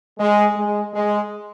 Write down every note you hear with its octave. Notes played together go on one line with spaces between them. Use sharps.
G#3
G#3
G#3